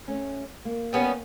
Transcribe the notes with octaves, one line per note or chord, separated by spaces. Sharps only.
A3 C#4
A#3
G3 B3 C#4